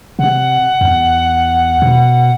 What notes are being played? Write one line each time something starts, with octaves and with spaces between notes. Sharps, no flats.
C3 F#5
E2
B2